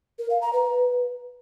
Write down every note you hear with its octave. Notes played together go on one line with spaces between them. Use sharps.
A#4
F5
A#5
B4